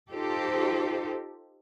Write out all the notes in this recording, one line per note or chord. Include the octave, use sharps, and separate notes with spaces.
D#4 F4 G4 A4 C5